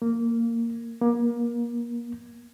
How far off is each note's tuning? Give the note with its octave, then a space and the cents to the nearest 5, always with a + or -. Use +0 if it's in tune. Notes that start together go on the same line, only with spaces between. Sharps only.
A#3 -10
A#3 +30